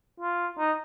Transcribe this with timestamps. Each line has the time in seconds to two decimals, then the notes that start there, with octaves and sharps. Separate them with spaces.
0.20 F4
0.59 D#4